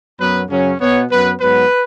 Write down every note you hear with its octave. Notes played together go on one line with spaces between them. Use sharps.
F#2 F#3 B3 B4
F#2 C#3 F#3 C#4
B2 B3 C#5
F#2 F#3 B3 B4
G#2 F#3 B3 B4